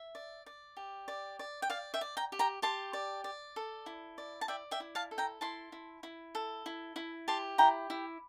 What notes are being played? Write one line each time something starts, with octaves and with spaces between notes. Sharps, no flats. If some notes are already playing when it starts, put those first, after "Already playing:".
Already playing: E5
D5
D5
G4
D5
D5
G5
D5 F5
E5 G5
D5
G5 A#5
G4
G5 A#5
G4 A5 C6
D5
D5
A4
E4
D5
A5
D5 E5 G5
E5 G5
E4
F5 A5
A4
G5 A#5
E4 A5 C6
E4
E4
A4
E4
E4
G4 A5 C6
E4 G5 A#5
E4